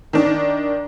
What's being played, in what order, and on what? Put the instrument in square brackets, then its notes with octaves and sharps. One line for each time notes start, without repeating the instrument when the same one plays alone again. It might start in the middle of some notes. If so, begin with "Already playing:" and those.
[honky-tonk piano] D#3 D4